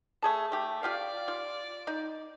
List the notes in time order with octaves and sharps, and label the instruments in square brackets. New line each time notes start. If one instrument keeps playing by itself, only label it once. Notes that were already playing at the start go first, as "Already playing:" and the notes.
[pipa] A3 G#4 A5
A3 G4
[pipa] F4 G4 F5 [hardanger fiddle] D5
[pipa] F4
D#4